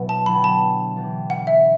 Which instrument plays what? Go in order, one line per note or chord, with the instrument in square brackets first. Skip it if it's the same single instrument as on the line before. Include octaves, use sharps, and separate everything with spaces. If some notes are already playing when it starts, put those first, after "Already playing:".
Already playing: [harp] B2 F#3 B3 E4 A4
[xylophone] A5
[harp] D3 F#3 B3 D4 G4 [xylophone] B5
[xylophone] A5
[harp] E3 B3 D4 G4
[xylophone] F#5
E5